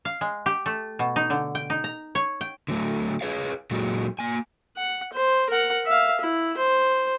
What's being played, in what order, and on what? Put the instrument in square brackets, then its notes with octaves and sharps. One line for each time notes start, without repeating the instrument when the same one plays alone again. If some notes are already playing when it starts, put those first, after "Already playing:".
[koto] F5
G#3
G4
A3
B2
D#4
D3
G5
D#4
A#5
C#5
G5
[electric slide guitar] D3 F#3 A3
G#4 B4 C#5 F5
A#2 F#3 G#3
A#3 G#5
[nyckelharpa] F#5
C5
A#4 F#5
E5 F5
E4
C5